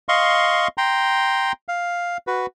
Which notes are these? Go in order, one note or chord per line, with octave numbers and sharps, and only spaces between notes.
D#5 F5 C6 C#6
G5 A#5 C6
F5
F#4 B4